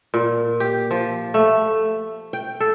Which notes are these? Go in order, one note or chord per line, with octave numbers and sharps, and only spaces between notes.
A#2
G4
F3
A3
G5
A4